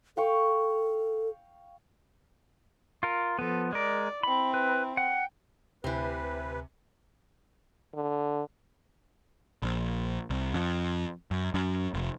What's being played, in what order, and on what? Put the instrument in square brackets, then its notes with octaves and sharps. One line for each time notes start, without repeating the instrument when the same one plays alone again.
[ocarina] A4 [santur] F5 G5 C#6
[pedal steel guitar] F4 A#4
[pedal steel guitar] F3 B3 [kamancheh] A4
[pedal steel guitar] G#3 A#4 [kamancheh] D5
[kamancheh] C4 E4 [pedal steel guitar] B5
[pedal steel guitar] B4
[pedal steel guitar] F#5 [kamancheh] G5
[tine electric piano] D2 G#5 [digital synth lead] C3 [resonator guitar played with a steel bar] C4 E4 [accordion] B4
[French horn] D3
[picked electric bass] A#1
C2
F2
F#2
F#2
F1